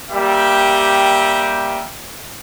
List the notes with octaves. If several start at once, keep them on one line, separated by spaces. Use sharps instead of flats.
G3 A#3 G4 E5 G5